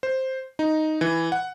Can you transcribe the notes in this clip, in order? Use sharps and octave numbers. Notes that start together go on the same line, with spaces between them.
C5
D#4
E3
F#5